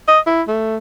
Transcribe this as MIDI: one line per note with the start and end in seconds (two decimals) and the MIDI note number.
0.08 0.20 75
0.27 0.42 64
0.48 0.77 57